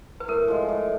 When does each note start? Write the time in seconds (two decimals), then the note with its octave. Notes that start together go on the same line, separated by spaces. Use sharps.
0.20 B4
0.28 A2 A#4
0.48 F3 G#3
0.69 A2